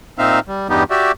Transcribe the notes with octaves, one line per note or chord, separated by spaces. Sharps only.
A#2 C4 D#4 E5 F5
G3
E2 G2 G3 B3 D#4 G4
F#4 G4 D5 E5